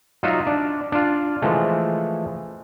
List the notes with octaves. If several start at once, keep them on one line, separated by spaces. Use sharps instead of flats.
F#3 D#4 F4 F#4 E5
D4
D4 F4
E3 F3 G#3 A3